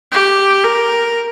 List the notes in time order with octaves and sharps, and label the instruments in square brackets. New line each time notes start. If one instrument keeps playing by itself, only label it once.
[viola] G4
A#4